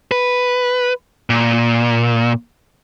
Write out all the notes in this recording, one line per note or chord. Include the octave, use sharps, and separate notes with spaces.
B4
A#2